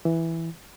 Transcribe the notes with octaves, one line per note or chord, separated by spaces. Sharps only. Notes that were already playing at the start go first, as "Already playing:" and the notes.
E3